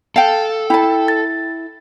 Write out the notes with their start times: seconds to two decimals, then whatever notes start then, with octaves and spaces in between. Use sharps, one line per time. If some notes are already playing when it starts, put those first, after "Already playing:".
0.16 A4 F5 G5
0.70 E4 G5 A5
1.08 A6